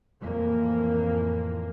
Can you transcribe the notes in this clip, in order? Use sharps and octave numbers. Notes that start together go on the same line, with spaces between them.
F2 A2 E3 A#3